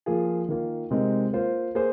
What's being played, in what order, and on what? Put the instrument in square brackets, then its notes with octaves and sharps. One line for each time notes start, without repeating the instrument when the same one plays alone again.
[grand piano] F3 A#3 F4 G#4
D#3 A#3 F4
C3 G#3 C4 D#4 A#4
A#3 F4 C5
A#3 G#4 C5